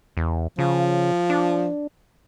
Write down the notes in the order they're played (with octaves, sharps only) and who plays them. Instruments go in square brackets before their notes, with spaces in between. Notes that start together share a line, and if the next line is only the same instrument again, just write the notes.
[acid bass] E2
[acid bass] C#3 [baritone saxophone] F3
[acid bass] D4